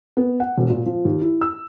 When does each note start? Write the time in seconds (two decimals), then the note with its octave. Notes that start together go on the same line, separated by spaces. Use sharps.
0.17 B3
0.40 F#5
0.58 E1
0.70 A#2
0.86 F3
1.05 D#2
1.21 E4
1.41 E6